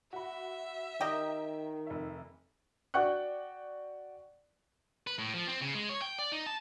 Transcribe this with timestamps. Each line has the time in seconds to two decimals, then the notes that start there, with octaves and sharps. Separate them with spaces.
0.13 F#4 E5 B5
1.01 D#3 G4 D#5 G5 A#5 A#6
1.87 F1 E5
2.94 F#4 D5 F#5 G5 C#6 F#6
5.07 B4
5.19 A2
5.34 F3
5.48 C4
5.61 C#3
5.75 G#3
5.89 C#5
6.02 G5
6.19 D5
6.32 D#4
6.46 A5